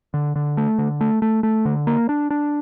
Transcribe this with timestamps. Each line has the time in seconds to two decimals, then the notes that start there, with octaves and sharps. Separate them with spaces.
0.14 D3
0.36 D3
0.57 A3
0.78 D3
1.01 A3
1.22 A3
1.43 A3
1.65 D3
1.87 A#3
2.09 D4
2.30 D4